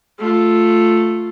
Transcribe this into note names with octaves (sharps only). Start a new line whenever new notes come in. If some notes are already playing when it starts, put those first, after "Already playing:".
A3 F4